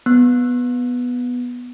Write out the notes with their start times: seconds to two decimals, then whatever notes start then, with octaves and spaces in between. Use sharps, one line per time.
0.06 B3 F#6